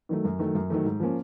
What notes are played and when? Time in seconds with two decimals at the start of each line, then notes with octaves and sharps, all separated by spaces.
0.09 D#3 F#3 A3
0.25 F#2
0.39 D#3 F#3 A3
0.55 F#2
0.70 D#3 F#3 A3
0.85 G#2
1.00 F3 A#3 C#4